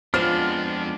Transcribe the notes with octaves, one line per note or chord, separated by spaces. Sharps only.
F2 G#3 B3 C4 D4 F4 C5 F6